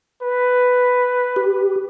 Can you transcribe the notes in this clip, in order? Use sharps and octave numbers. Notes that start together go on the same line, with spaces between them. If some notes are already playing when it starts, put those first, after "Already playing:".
B4
G4